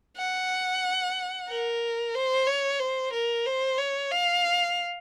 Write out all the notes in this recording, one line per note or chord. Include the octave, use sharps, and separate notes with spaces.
F#5
A#4
C5
C#5
C5
A#4
C5
C#5
F5